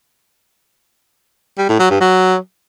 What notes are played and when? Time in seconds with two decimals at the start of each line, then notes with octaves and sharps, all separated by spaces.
1.58 G3
1.69 A2
1.80 F#3
1.90 G2
2.01 F#3